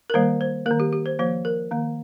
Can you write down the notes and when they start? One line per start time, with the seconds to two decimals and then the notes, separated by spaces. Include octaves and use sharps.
0.10 A#4
0.14 D#3 G3 A#3 C5
0.41 C5
0.66 A#3 A#4
0.71 D#3
0.80 G4
0.93 G4
1.06 C5
1.19 F3 A#3 C5
1.45 A#4
1.71 D#3 A#3